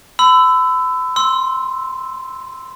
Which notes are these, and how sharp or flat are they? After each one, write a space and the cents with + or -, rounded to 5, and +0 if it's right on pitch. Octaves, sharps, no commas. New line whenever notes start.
B5 +40 E6 +0
C6 +0 E6 -5